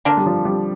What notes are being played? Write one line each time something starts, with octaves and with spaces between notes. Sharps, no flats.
D3 A#3 D4 F4
G3
F3
G3